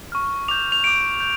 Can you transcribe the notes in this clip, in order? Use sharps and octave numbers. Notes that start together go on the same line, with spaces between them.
C#6 F6
D6 G6 F7
F7
D6 G6 D7
G6